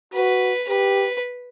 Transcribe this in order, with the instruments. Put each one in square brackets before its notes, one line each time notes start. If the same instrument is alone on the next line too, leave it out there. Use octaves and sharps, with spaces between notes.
[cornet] F#4 [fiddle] B4
[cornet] G4 [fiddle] B4